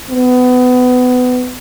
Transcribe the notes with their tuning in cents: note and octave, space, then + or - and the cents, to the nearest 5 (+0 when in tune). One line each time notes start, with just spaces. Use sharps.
B3 +25